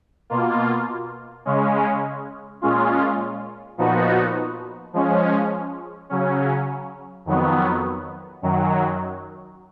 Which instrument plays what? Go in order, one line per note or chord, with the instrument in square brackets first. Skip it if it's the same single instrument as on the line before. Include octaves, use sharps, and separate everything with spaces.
[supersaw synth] B2 A#3 F4
C#3 G#3 C#4
A#2 G#3 C#4 F4
A#2 F3 B3 D#4 F#4
F3 G#3 C#4
C#3 F#3 C#4
F2 D#3 F#3 B3
F#2 D#3 F#3